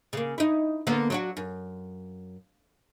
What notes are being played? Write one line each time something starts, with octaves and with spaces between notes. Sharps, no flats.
C#3 A#3
D#4 E4
D3 A#3 B3
F#3 D4 F#4
F#2